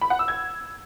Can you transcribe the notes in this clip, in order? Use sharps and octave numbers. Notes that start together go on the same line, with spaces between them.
B5
F#5
E6
G#6